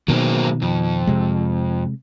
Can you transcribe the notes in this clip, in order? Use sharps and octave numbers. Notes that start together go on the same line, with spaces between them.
B2 D#3 F#3 A#3 C4
F2
C3 G#3